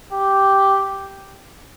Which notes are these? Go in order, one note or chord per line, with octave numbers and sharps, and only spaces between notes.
G4